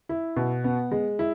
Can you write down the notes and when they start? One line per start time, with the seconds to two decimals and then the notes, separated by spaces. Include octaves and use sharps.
0.09 E4
0.36 B2
0.64 B3
0.92 G#3
1.19 E4